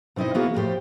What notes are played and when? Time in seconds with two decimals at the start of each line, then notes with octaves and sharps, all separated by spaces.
0.16 B2 C4 D#4 E4 D#5
0.34 E3 A#3 B3 E4 F#4 G#4
0.54 F2 A2 A3 F#4 G4 C5